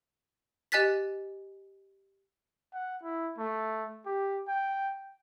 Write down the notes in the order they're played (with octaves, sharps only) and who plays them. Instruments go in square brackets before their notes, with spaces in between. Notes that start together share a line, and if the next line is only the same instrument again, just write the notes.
[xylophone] G4 D#5 G#5 F#6 A6 B6
[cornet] F#5
E4
A3
G4
G5